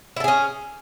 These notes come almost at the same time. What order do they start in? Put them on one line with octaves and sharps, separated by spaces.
E4 A4 G#4 C#4